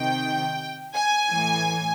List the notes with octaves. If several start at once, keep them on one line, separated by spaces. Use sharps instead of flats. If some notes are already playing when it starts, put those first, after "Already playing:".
Already playing: C3 D#3 G5
G#5
A2 E3